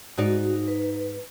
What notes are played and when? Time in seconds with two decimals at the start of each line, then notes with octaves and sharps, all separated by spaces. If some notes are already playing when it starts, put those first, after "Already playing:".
0.18 G#2 D#4 F#4 D5
0.68 B4